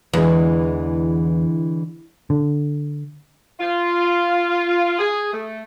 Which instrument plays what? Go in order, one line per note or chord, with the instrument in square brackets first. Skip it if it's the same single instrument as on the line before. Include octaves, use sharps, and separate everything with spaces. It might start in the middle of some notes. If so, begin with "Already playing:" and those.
[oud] E2 [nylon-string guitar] D3 E3 G#3
[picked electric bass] D3
[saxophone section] F4
G#4
A3